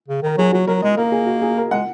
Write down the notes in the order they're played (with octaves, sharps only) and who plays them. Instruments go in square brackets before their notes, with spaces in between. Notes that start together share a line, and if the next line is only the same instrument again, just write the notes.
[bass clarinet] C#3
[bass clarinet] D#3 [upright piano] A#4
[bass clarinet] F#3 [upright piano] G#4
[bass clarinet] F#3 [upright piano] F#4
[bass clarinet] F#3 [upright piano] A#4
[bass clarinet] G#3 [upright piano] D#5
[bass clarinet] A#3 [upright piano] A#4
[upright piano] G#4
F#4
G#4
A#4
[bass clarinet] G#3 [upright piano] F#5